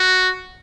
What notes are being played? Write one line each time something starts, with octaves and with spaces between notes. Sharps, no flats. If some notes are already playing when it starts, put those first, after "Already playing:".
Already playing: F#4